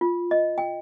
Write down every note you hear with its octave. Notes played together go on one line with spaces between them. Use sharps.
F4
D#5
G5